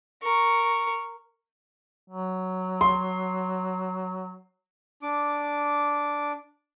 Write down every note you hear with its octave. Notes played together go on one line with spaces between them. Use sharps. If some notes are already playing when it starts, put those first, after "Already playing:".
A#4 C#6
F#3
C6
D4 D6